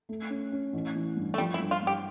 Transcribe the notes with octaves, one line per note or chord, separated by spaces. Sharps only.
A3
C#4
C#4
A1
E3
G2
A3
F3 G3
E4
G2
F4
G2 G4